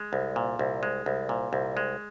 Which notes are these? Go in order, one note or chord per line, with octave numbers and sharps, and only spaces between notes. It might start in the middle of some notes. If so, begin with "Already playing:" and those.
Already playing: G#3
C2
A#2
C2
G#3
C2
A#2
C2
G#3